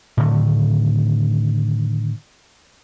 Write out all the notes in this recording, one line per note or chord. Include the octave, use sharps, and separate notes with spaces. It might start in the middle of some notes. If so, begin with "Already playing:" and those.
A2 D3 D#3 A3